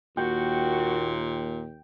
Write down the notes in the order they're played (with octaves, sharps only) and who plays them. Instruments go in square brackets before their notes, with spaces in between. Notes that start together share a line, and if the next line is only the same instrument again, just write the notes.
[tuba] D#2 [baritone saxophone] A#2 [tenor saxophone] F#4 [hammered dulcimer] G5